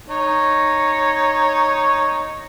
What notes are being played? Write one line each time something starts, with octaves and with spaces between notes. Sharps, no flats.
D#4 C#5